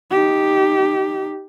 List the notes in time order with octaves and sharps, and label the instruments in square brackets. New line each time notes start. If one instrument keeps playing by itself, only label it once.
[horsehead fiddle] D#4 G4